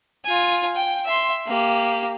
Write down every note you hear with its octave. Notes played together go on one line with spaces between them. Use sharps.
F4 G#5
G5
E5 C6
A#3 G4